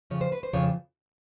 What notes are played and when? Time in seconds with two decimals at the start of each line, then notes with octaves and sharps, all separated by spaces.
0.10 F2 C#3 F3 C#5
0.21 C5
0.32 B4
0.43 C5
0.53 F2 C#3 F3 C#5